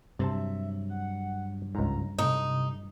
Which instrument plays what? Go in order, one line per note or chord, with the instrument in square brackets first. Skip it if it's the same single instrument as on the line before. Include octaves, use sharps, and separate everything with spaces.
[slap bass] G2 F#3 [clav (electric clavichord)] C3 C5 A5 [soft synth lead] E5
[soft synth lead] F#5
[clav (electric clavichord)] C#2 G#2 [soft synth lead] A#5
[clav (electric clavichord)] A2 [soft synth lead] C3 [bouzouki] D#4